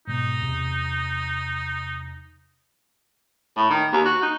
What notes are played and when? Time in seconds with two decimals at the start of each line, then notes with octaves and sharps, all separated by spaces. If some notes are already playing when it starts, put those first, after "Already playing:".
0.08 G#2 B2 D#4
0.40 E2 C3
3.56 A2
3.70 D#3
3.93 D#2
4.06 F#4
4.22 D#4